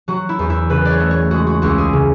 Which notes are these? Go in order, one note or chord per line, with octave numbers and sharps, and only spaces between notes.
F#3 F#4
E4
E2
E4
C#3 B4
D5
C#5
A3
C#5
G#3 F#4
F#4
C#2 F#4
G#4
C#3